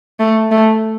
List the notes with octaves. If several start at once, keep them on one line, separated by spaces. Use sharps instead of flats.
A3
A3